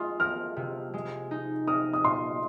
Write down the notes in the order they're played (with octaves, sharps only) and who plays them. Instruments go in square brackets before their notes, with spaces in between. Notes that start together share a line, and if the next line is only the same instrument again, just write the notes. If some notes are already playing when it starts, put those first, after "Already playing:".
Already playing: [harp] G#3 F4 [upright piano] C6 D#6
[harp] A#4 [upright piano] F6
[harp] C3
G#3
D#4
[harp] A#4 [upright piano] D#6
[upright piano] D#6
[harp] A#2 [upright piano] C6